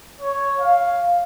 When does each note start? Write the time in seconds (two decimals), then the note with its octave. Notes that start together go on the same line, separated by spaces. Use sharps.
0.20 C#5
0.60 F5